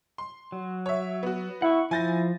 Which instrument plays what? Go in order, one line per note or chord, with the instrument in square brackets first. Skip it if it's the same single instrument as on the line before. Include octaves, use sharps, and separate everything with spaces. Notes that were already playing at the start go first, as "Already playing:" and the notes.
[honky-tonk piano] C6
[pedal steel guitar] F#3
[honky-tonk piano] C#5 E5
B3 F#4
[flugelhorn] E4 [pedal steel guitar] F#5 C#6
[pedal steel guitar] F3 G6 [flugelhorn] E4 [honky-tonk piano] G#5 A6 A#6